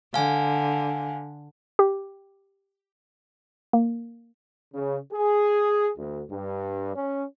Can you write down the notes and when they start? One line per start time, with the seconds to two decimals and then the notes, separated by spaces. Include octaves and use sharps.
0.14 D3 F5 G#5
1.79 G4
3.73 A#3
4.74 C#3
5.13 G#4
5.97 D2
6.31 G2
6.95 C#4